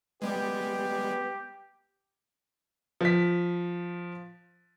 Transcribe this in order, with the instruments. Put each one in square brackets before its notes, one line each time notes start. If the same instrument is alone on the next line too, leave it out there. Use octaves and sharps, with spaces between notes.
[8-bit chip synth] G3 G#3 [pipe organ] B3 [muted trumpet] G4
[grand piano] F3 B6